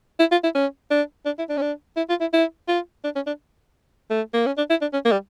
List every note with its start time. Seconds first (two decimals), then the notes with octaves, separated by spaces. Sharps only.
0.20 E4
0.32 F4
0.43 E4
0.55 C#4
0.91 D4
1.26 D4
1.38 E4
1.49 D4
1.57 C#4
1.62 D4
1.97 E4
2.09 F4
2.21 E4
2.33 E4
2.68 F4
3.04 D4
3.16 C#4
3.27 D4
4.10 A3
4.34 A#3
4.46 C#4
4.58 D4
4.70 E4
4.81 D4
4.93 C#4
5.05 A#3
5.12 G3